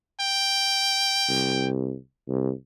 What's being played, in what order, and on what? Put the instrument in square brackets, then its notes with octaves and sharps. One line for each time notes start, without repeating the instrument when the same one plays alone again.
[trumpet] G5
[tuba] C2
C2